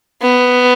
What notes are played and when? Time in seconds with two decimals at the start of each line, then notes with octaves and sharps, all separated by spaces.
0.22 B3